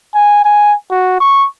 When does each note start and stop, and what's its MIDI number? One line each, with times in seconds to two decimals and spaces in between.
0.14 0.43 80
0.45 0.74 80
0.91 1.16 66
1.20 1.47 85